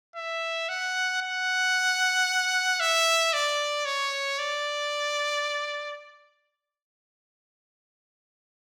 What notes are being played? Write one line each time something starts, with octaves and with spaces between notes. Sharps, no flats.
E5
F#5
F#5
E5
D5
C#5
D5